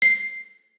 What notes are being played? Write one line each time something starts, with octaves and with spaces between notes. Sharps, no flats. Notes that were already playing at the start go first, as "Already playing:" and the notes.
C7